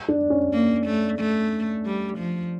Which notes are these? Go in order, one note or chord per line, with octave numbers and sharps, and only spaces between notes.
D4
C#4
A#3
A3
A3
G3
F3